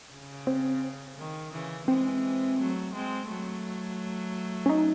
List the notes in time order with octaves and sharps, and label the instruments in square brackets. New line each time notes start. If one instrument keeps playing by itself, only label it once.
[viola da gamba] C#3
[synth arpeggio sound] C4
[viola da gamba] D#3
C#3 E3
[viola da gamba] E3 G#3 [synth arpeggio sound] C4
[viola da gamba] F#3 A3
G#3 C4
F#3 A3
[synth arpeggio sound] C#4
D#4